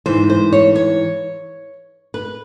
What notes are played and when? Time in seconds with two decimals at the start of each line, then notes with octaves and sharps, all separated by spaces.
0.06 G#2 E3 C5
0.30 C5
0.53 C#5
0.75 C#5
2.14 B4